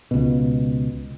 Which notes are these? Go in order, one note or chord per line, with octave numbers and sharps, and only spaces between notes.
C#2 B2